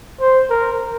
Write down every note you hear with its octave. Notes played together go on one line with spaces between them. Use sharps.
C5
A#4